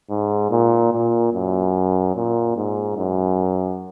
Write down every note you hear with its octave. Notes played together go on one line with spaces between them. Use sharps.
G#2
A#2
A#2
F#2
A#2
G#2
F#2